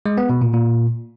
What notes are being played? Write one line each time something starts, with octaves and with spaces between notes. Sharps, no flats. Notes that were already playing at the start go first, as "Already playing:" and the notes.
G#3
B3
B2
A#2
A#2